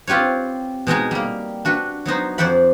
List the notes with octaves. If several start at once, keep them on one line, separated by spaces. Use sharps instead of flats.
C4 F4 G4 B4 C#5
B2 G#3 D#4 G#4
G3 A#3
D4 F#4 B4
F#3 B3 D#4 C5
F2 C5 D5 F#5 B5